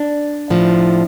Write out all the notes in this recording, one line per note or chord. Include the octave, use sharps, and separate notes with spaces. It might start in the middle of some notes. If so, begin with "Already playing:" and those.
Already playing: D4
A2 F3